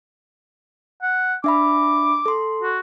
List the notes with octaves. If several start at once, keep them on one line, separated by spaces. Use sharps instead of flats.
F#5
D4 E5 B5 D6
A4 C6
F#4